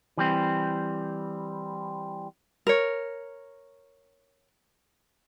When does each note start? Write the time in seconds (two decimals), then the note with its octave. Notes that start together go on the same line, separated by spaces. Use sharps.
0.17 E3 G3 C4
2.67 A#4 C#5